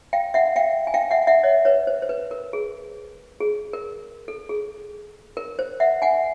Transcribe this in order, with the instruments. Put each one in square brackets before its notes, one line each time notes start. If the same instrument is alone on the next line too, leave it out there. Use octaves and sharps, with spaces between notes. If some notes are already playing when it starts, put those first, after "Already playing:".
[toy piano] F5 G5
E5 F#5
F5 G5
G#5
F5 G5
E5 F#5
E5 F#5
C#5 D#5
B4 C#5
C5
C5
B4
A#4
G#4
G#4
A#4
A4
G#4
A#4
C5
E5 F#5
F#5 G#5